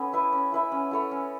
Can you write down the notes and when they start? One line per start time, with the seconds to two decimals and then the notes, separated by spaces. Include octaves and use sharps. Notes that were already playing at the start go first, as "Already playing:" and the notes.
Already playing: B3 C#4 A4
0.13 E4 B4 E5
0.33 C#4
0.52 E4 B4 E5
0.72 C#4
0.91 E4 A4 C#5
1.11 C#4